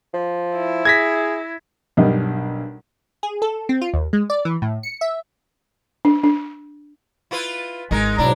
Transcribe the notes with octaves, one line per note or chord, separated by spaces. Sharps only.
F3
E4
G#4 G#6 A#6 B6
B1 G2 G3 A#4 D#5
G#4
A4
C4
F4
D#2
G#3
D5
E3
A2
C#7
E5
D4
D4
E4 F4 B4
G#1 G#3 D#4 A#4
G#2 B2 F#3 D4 E4 A#5